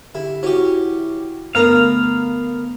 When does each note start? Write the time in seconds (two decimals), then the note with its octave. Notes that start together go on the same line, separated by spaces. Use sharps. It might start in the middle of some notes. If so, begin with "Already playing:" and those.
0.15 D3 E4 G4
0.43 C#4 E4 F#4 G4
1.55 G2 D3 A3 B3 A#4 F5